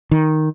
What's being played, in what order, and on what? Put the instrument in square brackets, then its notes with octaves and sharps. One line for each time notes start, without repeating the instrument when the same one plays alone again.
[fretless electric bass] D#3